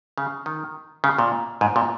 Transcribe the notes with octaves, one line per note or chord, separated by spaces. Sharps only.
C#3
D#3
C#3
A#2
G#2
A#2